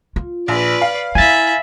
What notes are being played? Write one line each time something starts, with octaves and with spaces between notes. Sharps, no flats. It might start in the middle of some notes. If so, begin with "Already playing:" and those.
F4
A#1 B4 D5
F5
E4 F4 E5 G#5 B5 A6